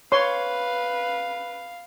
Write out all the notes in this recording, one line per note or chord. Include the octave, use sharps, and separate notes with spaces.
B4 C#5 F5 C6